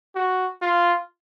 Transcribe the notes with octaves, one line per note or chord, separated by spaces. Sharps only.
F#4
F4